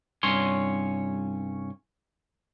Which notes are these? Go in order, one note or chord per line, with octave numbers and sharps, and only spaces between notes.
C2 G2 C#4 C#5 C6